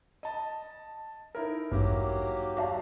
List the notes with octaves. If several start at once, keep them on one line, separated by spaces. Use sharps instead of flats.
D#5 A5
D#4 E4 A#4
A1 E2 G2 F#3 A#3 G4
F#4 D5 F5 A5